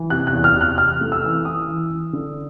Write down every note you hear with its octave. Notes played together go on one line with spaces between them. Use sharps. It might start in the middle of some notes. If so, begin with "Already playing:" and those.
Already playing: E3
C3 F#6
F#6
E2
F6
C3
F#6
C3 F6
A3
E6
E3
E3 D#6
E3
E3
D3